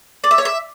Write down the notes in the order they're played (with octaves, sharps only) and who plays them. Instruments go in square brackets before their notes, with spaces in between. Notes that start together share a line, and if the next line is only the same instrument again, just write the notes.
[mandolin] D5
E5
C#5
E5